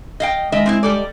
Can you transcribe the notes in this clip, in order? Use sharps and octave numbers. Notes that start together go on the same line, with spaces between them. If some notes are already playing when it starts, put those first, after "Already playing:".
D#5 F5 G5
D#3 G#3 D#5 E5
C4 D#4 E4
G3 A4 D5